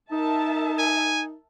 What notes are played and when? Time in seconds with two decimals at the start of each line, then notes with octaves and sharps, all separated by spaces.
0.12 D#4 A#4 E5 A5
0.79 G#5